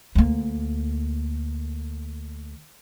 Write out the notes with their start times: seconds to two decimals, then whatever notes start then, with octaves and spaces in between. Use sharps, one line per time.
0.15 D2 A#3